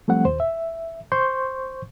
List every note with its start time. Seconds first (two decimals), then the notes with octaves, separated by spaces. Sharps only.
0.08 F3 G3 A3 C4 F#5
0.25 D#2 C5
0.40 E5
1.12 C5 C6 C#6 G6